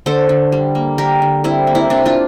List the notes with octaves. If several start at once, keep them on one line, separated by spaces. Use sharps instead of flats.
D3 A4 C5
D3
G3
A#3
D3 G4 A#4
D3
G3 C4 E4
A#3
C4 E4
C3 D4
D4 F4